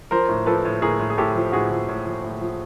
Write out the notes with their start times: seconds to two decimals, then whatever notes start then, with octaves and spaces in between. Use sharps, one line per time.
0.11 F3 A#4 C5
0.29 A2
0.46 F3 A4 B4
0.65 A2
0.82 A2 G#4 A#4
0.99 A2
1.10 G#4
1.18 A2 G4 A4
1.36 F3
1.52 A2 F#4 G#4
1.71 F3
1.89 A2
2.06 F3
2.24 A2
2.42 F3